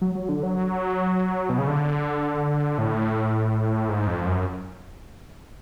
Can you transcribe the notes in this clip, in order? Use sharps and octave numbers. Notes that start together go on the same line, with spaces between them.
F#3
F#3
D3
F#3
B2
C#3
D3
A2
G#2
F2
F#2